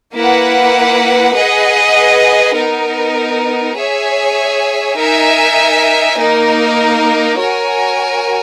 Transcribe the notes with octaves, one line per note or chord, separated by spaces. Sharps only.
A#3 E4 B4 F#5
G#4 B4 D#5 F#5
B3 D#4 A#4
G#4 C#5 E5 G#5
D#4 A#4 E5 G#5
A#3 D#4 A#4
F#4 A#4 C#5 G#5